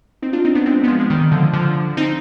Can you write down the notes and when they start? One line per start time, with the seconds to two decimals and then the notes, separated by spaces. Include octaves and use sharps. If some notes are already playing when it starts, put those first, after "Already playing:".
0.22 C4 D#4
0.33 D4 F4
0.45 C4 D#4
0.55 B3 D4
0.66 G#3 C4
0.84 B3
0.88 F3 G#3
1.00 G#3
1.10 D#3 G3
1.31 D3 F3
1.53 D3 F3
1.97 C4 D#4